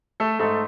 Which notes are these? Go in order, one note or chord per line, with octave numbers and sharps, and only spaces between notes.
A3 A4
G#2 A3 A4